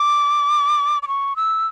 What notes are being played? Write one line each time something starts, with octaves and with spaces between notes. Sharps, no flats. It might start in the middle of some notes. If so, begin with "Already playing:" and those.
Already playing: D6
D6
C#6
E6